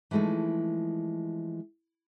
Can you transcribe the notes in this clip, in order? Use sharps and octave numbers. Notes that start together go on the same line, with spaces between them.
E3 F3 G#3 A3 D#4